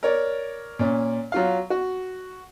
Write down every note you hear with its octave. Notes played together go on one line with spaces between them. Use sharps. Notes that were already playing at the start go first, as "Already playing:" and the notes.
A#4 C#5 D5
A#2 C#4
F#3 F4 F5
F#4